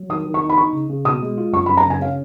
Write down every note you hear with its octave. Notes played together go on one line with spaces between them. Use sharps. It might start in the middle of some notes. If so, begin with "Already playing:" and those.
Already playing: F#3
D#3 D#6
D#3
C#6
D#4
B5
D#4 C#6
C#3
C#3
B2 D#6
G#3
F4
F#2 C#6
B5
F#2
A#5
C#3 G#5
C#4 F5